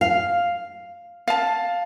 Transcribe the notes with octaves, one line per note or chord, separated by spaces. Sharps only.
F5
F5 A5